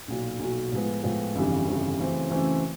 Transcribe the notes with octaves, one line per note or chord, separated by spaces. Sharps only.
B1 A#2 F#3
B1 A#2 F#3
A2 F3 G#3 B3
A2 F3 G#3 B3
G1 F2 C#3 E3 G3
G1 F2 C#3 E3 G3
F#2 C#3 E3 A3 C4
F#2 C#3 E3 A3 C4